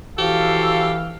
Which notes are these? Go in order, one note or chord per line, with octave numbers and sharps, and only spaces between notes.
E3 F3 F#4 G4 A4 F5